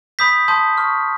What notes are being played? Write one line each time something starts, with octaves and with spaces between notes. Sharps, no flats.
B5 D#6 G6 B6
A5 C6 D#6 G6
C#6 F6